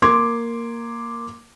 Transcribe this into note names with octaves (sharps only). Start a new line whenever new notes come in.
A#3 C6 D6 G#6